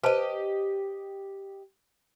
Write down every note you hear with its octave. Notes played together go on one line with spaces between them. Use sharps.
G4 B4 C5 D#5 A5